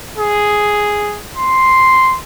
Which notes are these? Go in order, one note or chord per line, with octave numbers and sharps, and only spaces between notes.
G#4
C6